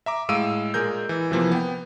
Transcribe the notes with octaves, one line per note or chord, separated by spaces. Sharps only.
E5 A#5 D6
A2 G#3 F5 E6 D7 D#7
A#2 G#3 G#4 A#4 G6
E3
C3 E3 F3 A#3 B3
B3 G5